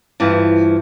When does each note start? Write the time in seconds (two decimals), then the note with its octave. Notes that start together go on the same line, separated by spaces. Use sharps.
0.20 G2 E3 F3